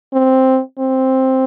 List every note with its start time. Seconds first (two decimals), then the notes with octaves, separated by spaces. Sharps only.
0.13 C4
0.79 C4